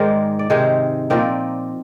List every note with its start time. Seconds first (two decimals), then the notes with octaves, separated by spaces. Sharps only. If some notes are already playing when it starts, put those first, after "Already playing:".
Already playing: G#2 D#3 G#3 A#4 C5 D5
0.39 D5
0.50 C3 D#3 G#3 D#4 G#4 C5
1.10 A#2 F3 C4 D#4 A#4 D5